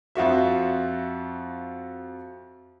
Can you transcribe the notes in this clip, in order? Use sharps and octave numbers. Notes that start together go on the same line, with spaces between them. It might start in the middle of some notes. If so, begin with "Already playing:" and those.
F2 F4 F#4 E5